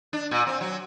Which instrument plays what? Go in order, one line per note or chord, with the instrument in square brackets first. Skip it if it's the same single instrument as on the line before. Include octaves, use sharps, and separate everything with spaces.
[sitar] D4
A#2
C4
F#3